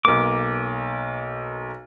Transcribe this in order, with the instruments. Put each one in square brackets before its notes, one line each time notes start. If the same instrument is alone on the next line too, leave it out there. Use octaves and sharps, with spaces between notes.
[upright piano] B1 A#3 [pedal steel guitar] D6